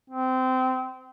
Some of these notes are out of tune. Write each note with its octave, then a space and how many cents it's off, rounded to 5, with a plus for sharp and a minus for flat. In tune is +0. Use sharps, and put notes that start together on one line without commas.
C4 -20